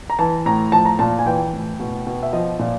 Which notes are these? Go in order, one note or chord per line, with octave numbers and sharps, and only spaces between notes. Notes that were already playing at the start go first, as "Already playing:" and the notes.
A#5
E3 A5
A2 A#5
F3 A5
A#5
A#2 A5
G#5
E3 G5
A2
B2
B2
E5
F3 D#5
A#2